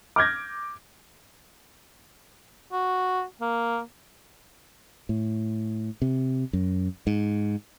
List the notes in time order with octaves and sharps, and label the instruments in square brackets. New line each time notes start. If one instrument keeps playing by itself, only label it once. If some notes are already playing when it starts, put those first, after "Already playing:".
[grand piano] D6 F6 G6 G#6 A#6
[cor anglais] F#4
A#3
[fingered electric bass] A2
C3
F#2
G#2